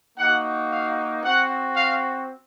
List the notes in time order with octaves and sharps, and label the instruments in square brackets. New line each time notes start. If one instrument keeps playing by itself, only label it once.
[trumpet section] A#3 D#4 F#4 F#5
F5
C4 F#4 F#5
F5